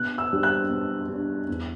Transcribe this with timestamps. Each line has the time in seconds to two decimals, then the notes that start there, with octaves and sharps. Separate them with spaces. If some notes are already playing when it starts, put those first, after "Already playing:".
Already playing: B2 F#6
0.18 E6
0.30 G3 D4
0.43 F#6
0.70 B2
1.09 G3 D4
1.48 E2